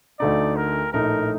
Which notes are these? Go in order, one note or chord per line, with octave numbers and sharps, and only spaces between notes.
D2 D3 A3 D#4 D5
A#4
A#1 A2 A3 D#4 A#4